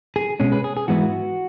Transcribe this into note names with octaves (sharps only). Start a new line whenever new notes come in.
G#4
B2 G#3 C#4 G#4
G#4 B4
G#4
G#4
G#2 E3 G#3 B3 E4 F#4